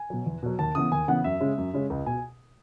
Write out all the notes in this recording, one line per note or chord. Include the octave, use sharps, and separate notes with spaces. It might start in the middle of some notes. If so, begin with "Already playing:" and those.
Already playing: G#5
B2 F#3
E2
B2 F#3
D#2 A5
C#3 E3 B3 D#6
D#2 G#5
C#3 E3 B3 F#5
F#2 E5
C#3 G#3 C#4
F#2
C#3 G#3 C#4
C#2
B2 G#5